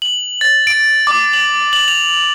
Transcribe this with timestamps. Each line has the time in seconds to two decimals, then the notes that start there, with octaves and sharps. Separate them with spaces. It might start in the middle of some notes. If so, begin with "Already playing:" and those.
0.02 F#7
0.41 A6
0.67 D7
1.07 D6
1.33 F#7
1.73 F#7
1.88 F7